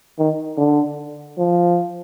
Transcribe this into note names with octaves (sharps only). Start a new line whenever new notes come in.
D#3
D3
F3